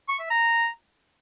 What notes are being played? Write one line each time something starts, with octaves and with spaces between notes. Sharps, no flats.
C#6
E5
A#5